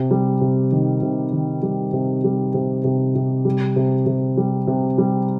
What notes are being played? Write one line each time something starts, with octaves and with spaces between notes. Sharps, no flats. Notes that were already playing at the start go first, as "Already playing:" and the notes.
Already playing: C3
G3
C3
D#3
C3
D#3
G3
C3
G3
C3
C3
C3
G3
C3
C3
G3
C3
G3